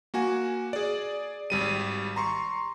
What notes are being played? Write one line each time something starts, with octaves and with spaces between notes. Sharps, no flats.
A#3 F#4 G#5
G#4 D5
G#1 G3 D#7
A#5 C6 C#6